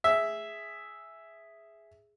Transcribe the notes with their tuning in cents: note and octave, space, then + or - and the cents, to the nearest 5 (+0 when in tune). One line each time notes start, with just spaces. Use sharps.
G#4 +0 E5 +0